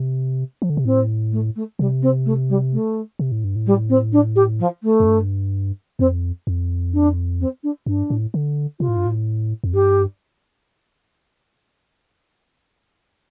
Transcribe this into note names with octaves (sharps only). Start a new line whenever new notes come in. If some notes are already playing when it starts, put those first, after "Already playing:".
Already playing: C3
F3
D3
C3
A2 C4
A3
A3
C3 G3
C4
A3
G3
A3
C3
A2
G2
A2
G3
C4
D4
G4
F3
A3
F2
G2
F2 C4
F2
D4
C4
D4
G2 D4
A2
D3
C3 F4
A2
G2
A2
F2
G2 G4